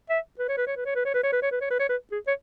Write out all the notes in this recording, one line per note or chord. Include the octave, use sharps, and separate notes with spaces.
E5
B4
C#5
B4
C#5
B4
C#5
B4
C#5
B4
C#5
B4
C#5
B4
C#5
B4
C#5
B4
G#4
C#5